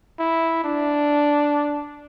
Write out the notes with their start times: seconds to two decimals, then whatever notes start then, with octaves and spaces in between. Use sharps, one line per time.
0.19 E4
0.64 D4